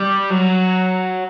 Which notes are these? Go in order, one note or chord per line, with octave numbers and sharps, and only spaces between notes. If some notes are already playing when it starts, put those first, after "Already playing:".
Already playing: G3
F#3